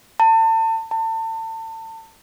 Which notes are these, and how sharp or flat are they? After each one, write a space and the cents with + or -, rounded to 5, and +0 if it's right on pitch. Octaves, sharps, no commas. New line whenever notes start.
A5 +35
A5 +35